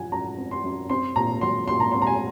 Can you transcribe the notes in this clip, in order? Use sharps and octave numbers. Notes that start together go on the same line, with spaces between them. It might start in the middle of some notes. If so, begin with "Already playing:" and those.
Already playing: F#2 F3 F#5 G#5
F#2 A#5
C4
C6
F#2
C4 C6
A#2 A#5
F#3 C6
A#2 C6
A#5
C4 C6
A#5
G#5